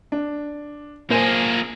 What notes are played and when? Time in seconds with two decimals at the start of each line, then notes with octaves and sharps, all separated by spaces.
0.12 D4
1.10 A#2 A#3 G#4 C5 G#5